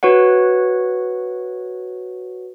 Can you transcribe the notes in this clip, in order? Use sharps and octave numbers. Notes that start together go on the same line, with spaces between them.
F#4 B4 C#5 F#5